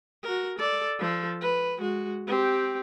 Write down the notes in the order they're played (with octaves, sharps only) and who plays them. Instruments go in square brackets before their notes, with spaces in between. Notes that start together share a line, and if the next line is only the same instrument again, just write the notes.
[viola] F#4 A#4
A4 D5
F3 A4
B4
G#3 F#4
C4 G4